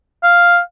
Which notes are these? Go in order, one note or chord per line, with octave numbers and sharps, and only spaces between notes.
F5